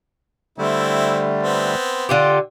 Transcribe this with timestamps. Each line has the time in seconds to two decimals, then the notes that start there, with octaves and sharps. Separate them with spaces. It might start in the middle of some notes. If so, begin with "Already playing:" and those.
0.58 D3 G3 A3 C4 E4
1.43 B3 C4
2.09 D3 F4 G4